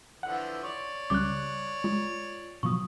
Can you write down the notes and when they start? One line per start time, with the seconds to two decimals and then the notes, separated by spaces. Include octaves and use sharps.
0.23 D3 E3 F3 F#5
0.64 C#5 D5
1.10 C#2 C#3 G3 D6 F#6
1.84 G#3 F4
2.63 B2 F3 F#3 C#6 D#6